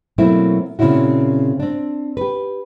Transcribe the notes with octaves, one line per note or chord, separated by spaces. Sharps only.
B2 F#3 A3 A#3 C4 E4
A#2 C#3 C4 C#4 E4 F#4
C4 D4
G4 B4